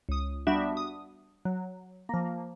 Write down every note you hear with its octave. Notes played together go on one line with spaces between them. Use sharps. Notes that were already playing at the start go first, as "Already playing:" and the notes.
C#2 D#6
G3 B3 D4 F#4 E5
D#6
F#3
F3 A#3